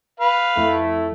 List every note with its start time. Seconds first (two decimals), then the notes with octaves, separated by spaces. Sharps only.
0.20 B4 F5
0.57 F2 A3 E4